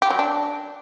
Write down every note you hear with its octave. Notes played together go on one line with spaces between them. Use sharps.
G4
F#3
D4